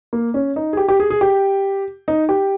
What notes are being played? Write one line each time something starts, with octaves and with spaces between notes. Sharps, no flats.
A#3
C#4
D#4
G#4
G4
G4
G#4
G#4
G4
D#4
G4